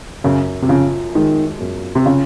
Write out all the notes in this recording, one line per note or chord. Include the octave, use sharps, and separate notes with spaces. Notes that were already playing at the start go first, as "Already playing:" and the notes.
F#2 C#3
C3
C#3 F3
D#3 G#3
F#2
C3
C#3 F4